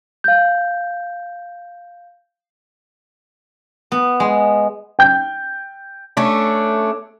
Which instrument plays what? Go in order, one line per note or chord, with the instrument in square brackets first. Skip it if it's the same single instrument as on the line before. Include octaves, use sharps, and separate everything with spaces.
[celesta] F5 G6
[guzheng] B3
G#3
[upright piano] G5 G6
[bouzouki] A3 C#4 D4